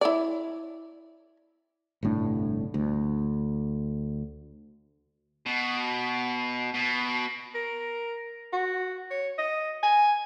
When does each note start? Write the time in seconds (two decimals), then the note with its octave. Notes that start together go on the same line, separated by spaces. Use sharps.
0.01 E4 C#5 D5
2.03 G1 C2 A2 D4
2.74 D2
5.46 B2
6.74 B2
7.55 A#4
8.53 F#4
9.11 C#5
9.38 D#5
9.83 G#5